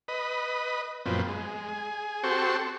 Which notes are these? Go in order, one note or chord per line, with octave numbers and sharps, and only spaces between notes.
B4 D#5
F#2 A#2 F3 B3 C4
G#3
G#4
C4 F#4 G4 A4 C5 C#6